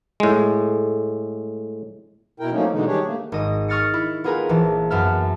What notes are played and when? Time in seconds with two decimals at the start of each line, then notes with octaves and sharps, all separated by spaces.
0.20 A2 G#3
2.40 B2 E4 A#4 G5
2.52 F3 F#3 A3 A#3 C#4 D#4
2.70 B2 D3 E3 G#3 D#4
2.86 D#3 G3 D4 G4 G#4 C#5
3.05 A3 A#3
3.32 G#1 D#5 D#6
3.68 C#6 D#6 F6 A6 A#6 C#7
3.94 E4
4.24 B3 F4 G#4 A#4 B4 G#5
4.49 A#1 E3 A5
4.90 F#2 B3 E5 A5 F6